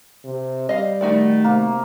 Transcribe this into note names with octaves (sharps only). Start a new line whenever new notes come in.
C3
G3 D#5 F5
D#3 A3 D#4 F#4 D5
C3 A#3